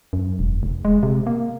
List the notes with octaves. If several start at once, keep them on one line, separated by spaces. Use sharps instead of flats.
F#2
E1
F1
G#3
C3
A#3